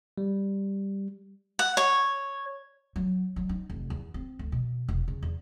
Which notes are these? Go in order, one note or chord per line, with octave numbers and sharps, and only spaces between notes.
G3
F#5
C#5
F#3
F#3
D#4
F1
E2
C4
D2
B2
E1
C#3
E2